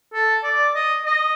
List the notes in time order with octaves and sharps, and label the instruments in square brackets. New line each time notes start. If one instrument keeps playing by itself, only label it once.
[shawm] A4
D5
D#5
D#5